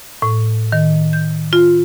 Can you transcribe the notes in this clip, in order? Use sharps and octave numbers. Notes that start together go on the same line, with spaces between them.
A2
D#3
G6
F4